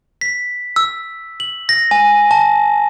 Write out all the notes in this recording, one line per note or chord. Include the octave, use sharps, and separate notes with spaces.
B6
E6
F#7
A#6
G#5
A5